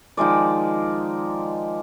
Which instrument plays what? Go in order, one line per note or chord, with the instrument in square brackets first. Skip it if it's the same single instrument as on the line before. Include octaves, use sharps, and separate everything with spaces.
[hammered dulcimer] D#3 F3 G#3 D5